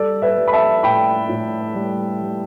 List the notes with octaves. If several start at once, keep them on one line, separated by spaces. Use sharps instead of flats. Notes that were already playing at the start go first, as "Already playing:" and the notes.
Already playing: G3 A4 D5
B4 E5
G3
B5
E5 A5
A2 G5 B5
A2
G3
G3